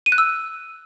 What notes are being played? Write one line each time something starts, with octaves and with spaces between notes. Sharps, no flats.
D#7
F#6
E6